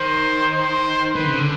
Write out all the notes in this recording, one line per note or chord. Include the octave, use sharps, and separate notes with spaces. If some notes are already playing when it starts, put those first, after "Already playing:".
Already playing: D#3 C5
C5
D#3 B4
D3
C#3
D3